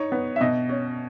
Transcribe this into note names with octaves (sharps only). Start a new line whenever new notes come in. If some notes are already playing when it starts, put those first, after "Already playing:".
Already playing: D#4 C#5
B3
E5
B2 D#5
C#4